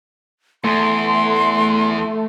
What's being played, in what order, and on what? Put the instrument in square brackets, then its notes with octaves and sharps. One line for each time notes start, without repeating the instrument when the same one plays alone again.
[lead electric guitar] E2 [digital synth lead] A3 [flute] C6